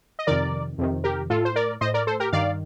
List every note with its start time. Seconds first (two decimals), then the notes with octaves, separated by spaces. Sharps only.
0.19 D#5
0.27 F2 C3 D#3 A#4 D5
0.78 F2 C3 D#3
1.04 G4 A#4
1.30 A2 F4 A4
1.45 C5
1.56 A#4 D5
1.81 A2 C5 D#5
1.94 A#4 D5
2.07 A4 C5
2.20 G4 A#4
2.32 G2 D#3 D5 F5